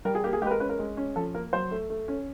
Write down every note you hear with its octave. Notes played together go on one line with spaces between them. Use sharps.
G3 A#4
G#4
A#3 G4
G#4
G#3 G4 B4
A#4
C#4 B4
A#4
G#3
C#4
F3 A4
A#3 A#4
F#3 C5
A3
A3
C#4